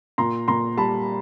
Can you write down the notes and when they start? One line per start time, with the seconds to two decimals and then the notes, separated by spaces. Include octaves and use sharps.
0.18 A#2 A#5 C6
0.48 A#2 A#5 C6
0.77 G3 A5 B5